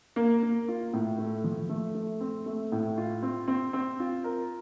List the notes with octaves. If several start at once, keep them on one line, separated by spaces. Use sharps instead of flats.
A#3
A#3
F4
A2
A3
F3
A3
A3
C4
A3
A2
F4
C4
C4
C4
F4
A#4